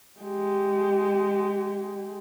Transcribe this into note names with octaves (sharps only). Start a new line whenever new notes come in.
G#3 G4